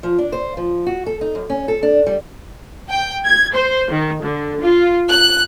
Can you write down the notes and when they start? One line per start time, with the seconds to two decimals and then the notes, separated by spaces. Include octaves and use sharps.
0.03 F3
0.18 D4
0.32 C5
0.57 F3
0.86 F#4
1.06 A4
1.21 D#4
1.35 F#2
1.50 C#4
1.68 A4
1.83 D4
2.06 G3
2.88 G5
3.25 G#6
3.53 C5
3.91 D#3
4.22 D3
4.61 F4
5.11 F#6